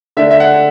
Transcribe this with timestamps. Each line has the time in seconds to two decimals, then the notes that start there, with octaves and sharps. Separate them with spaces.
0.17 D3 A3 D4 E5
0.31 E5
0.40 F#5